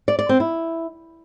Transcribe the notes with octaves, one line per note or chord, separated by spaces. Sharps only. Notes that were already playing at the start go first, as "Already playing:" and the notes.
D5
D5
C4
E4